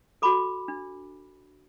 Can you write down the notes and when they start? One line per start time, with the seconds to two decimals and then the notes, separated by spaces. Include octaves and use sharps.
0.22 F#4 A4 B5 D6
0.68 D4